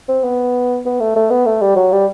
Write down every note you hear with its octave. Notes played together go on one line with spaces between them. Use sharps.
C4
B3
B3
A3
A3
B3
A3
G3
F#3
G3